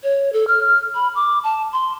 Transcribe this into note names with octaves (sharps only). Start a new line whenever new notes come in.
C#5
A4
F6
B5
D6
A5
C6